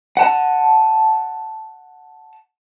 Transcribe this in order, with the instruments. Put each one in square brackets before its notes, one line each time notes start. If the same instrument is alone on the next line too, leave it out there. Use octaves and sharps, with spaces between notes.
[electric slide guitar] F#5 A5